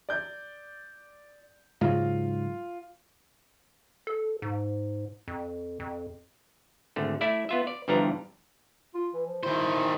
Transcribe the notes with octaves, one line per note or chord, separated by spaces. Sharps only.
D5 G6
G#2 C#3 F#3 F4
A4
G#2
F2
F2
G#1 D3 A3
A3 E4 D5 E5
B3 F4 E5
D5
G1 G2 E3 F3 D4 A#5
F4
E3
F3
D#3 E4 C5